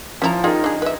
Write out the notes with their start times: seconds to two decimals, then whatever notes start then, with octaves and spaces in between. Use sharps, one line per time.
0.22 F3 C#4 E4 A#5
0.44 D#4 F4 G4 G#4 A#4
0.64 D4 G#4
0.82 B4 E5